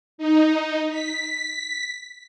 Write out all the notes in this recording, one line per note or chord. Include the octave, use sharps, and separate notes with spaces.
D#4
B6